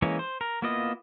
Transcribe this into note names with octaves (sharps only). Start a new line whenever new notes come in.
E3 G#3 A#3 C#4 C#5
C5
A#4
A#3 B3 E4 F4 D#5